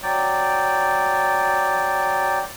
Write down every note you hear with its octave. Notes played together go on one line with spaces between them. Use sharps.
F#3 D5 G5